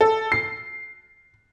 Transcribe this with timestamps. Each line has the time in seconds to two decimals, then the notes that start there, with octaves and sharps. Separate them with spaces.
0.01 A4
0.32 C7